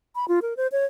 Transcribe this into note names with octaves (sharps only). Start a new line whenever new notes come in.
B5
F4
A#4
C5
C#5